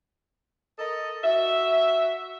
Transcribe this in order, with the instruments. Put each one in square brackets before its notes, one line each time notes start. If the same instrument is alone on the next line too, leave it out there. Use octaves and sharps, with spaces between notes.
[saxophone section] A4 A#4 D#5
F#4 E5